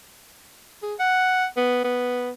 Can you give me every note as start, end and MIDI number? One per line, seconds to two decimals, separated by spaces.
0.82 0.95 68
1.00 1.46 78
1.57 1.80 59
1.84 2.31 59